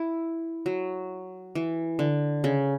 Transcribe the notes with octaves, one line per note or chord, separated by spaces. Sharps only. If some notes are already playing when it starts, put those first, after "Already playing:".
Already playing: E4
F#3
E3
D3
C#3